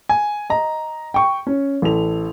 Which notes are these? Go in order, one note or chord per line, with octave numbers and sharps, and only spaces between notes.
G#5
D#5 A#5
G5 C#6
C#4
A1 A4 F7